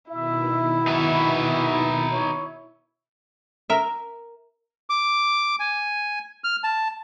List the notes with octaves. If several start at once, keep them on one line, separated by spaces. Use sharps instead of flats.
B2 D#3 E4 E5
D#4 F#4 B4
C#5
A#4 E5
D6
G#5
F6
A5